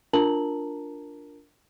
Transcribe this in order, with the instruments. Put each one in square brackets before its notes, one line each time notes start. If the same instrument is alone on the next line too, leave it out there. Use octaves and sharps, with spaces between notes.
[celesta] D4 F4 A#4 A5 A#5 F#7